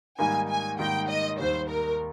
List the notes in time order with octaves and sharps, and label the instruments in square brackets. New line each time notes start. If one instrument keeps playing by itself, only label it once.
[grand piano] G#2 D#3 G3 A#3 D#4 [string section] G#5
[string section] G#5
[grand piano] G#2 D#3 G3 A#3 D#4 [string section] G5
[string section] D#5
[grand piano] D#2 D#3 G3 [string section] C5
[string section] A#4